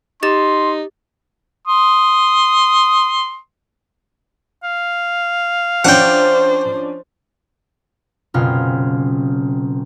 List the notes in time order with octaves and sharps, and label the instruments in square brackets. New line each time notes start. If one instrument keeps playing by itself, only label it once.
[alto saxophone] D#4 [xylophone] G4 A6 E7 [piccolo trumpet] C6
[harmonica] C6 D#6
[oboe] F5
[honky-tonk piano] F3 C#4 D4 [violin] C5 [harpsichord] F#5 G5
[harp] F#1 B2 C4 C#4 F4 F6